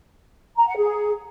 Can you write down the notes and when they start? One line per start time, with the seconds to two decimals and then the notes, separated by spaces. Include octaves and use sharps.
0.57 A#5
0.67 F#5
0.77 G#4